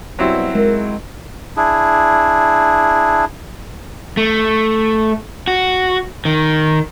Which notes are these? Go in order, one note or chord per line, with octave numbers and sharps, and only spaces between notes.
B2 F#3 G3 C4 E4
G#3 A#4
D4 E4 G#4
A3
F#4
D#3